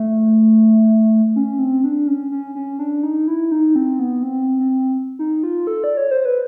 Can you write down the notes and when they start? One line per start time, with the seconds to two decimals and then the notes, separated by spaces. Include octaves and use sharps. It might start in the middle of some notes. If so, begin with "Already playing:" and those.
Already playing: A3
1.36 C#4
1.59 C4
1.84 D4
2.08 C#4
2.31 C#4
2.55 C#4
2.79 D4
3.03 D#4
3.28 E4
3.52 D#4
3.76 C4
3.99 B3
4.23 C4
4.59 C4
5.19 D#4
5.43 F4
5.67 A4
5.84 D5
5.97 C#5
6.11 C5
6.25 B4